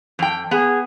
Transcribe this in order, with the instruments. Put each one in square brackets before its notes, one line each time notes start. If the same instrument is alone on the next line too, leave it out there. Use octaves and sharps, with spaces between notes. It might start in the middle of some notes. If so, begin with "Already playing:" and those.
[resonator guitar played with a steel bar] F2 G5
[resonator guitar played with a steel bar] B3 [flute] G#4